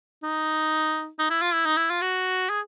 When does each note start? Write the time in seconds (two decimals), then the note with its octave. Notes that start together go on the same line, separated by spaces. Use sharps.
0.23 D#4
1.19 D#4
1.30 E4
1.41 F4
1.54 E4
1.66 D#4
1.77 E4
1.90 F4
2.02 F#4
2.50 G#4